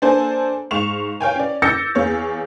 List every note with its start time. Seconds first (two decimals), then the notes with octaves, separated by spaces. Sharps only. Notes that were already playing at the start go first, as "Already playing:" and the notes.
0.02 A#3 D4 A4 C5 G#5 A5
0.71 G#2 F5 C#6 E7 F7
1.20 C#5 F5 G5 G#5
1.35 C#4 D5
1.62 D6 E6 G6 A6 A#6 C#7
1.95 E2 C#5 F5